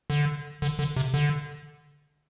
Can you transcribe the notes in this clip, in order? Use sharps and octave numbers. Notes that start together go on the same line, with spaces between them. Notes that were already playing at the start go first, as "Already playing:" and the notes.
D3
D3
D3
C3
D3